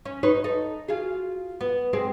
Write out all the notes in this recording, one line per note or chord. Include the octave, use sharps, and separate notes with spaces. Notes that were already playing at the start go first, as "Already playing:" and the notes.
C#4
D#4 B4 C#5
D#4 A4
F4 F#4 G#4
B3
G#3 C4 G#4